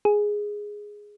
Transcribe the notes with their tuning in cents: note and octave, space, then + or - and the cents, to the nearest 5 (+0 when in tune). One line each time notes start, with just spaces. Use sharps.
G#4 +0